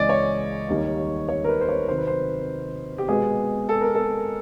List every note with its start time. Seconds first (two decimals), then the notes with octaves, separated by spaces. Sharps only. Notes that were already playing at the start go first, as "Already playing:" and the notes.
Already playing: C#2 C#3 E3 G#3 C#4 D5 D#5
0.09 C#5
0.68 D#2 D#3 G3
1.28 C#5
1.44 A#4
1.49 B4
1.61 C5
1.69 C#5
1.88 C3 D#3 F#3 C5
1.98 B4
2.07 C5
2.98 G4
3.08 B2 G#3 B3 G#4
3.69 A4
3.81 A#4
3.95 A4